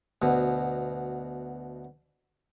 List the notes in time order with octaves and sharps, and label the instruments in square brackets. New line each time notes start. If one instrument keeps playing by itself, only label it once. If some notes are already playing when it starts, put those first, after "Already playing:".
[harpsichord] D2 B2